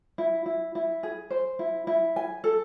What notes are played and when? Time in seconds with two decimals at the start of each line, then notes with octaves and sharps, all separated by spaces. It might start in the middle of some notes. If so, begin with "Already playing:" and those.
0.18 E4
0.46 E4
0.75 E4
1.03 G#4
1.30 C5
1.59 E4
1.87 E4
2.16 G#5
2.44 A4